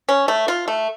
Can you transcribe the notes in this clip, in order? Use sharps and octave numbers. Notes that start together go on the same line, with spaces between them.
C#4
A3
F4
A3